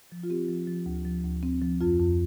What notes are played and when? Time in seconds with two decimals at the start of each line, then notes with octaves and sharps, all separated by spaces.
0.12 F3
0.23 F4
0.30 C4 G4
0.49 F3
0.67 F3
0.86 D2
1.05 F3
1.24 D2
1.43 C4
1.62 F3
1.81 F2 F4
2.00 F2